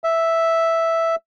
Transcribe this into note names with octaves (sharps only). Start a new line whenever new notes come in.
E5